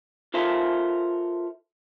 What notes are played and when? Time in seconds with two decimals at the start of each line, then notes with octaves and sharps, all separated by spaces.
0.34 F4 A4 A#4 C5 E5 F5